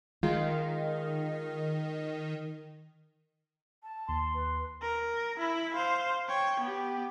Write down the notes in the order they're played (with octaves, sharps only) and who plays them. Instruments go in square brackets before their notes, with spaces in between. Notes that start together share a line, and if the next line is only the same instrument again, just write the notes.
[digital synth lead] D#3 [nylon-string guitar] G#3 F4
[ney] A5
[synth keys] D#2 [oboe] C6
[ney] B4
[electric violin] A#4
E4 B5
C5 F5
C#5 G5
B3 G4